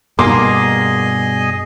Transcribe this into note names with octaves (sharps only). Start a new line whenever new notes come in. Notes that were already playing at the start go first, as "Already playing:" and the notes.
G2 B2 A#3 G#4 D#5 C6 D6